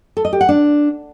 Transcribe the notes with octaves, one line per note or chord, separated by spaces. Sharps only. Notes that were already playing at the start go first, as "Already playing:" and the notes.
A4
D#5
G4
F#5
D4